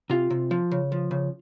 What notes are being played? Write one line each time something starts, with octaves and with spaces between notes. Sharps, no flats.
C3 F4
C3
F3
C#3
F3
C#3